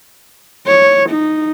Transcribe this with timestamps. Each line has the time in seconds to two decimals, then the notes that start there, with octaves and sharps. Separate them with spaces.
0.67 C#5
1.11 D#4